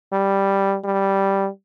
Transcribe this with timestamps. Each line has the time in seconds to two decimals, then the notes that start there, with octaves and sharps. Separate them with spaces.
0.13 G3
0.84 G3